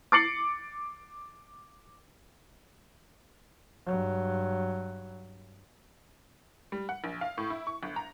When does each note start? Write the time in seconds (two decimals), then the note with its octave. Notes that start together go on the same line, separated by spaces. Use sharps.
0.12 D6 A6 C7 C#7 F#7
3.86 G2 F#3
6.72 G3
6.89 F#5
7.04 A#1
7.21 F5
7.38 A2
7.50 E4
7.67 C#6
7.83 G1
7.96 A#5